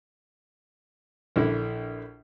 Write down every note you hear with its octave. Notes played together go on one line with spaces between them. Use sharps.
A#1 D3 E4